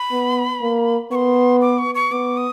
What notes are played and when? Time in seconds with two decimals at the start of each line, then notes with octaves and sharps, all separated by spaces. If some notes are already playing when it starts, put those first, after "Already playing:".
Already playing: B5
0.11 B3
0.62 A#3
1.11 B3 C6 C#6
1.62 D6
1.78 C#6
1.95 C#6
2.12 B3 D6
2.37 D#6